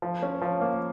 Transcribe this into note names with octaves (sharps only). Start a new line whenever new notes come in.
F3
C#4
F3
A#3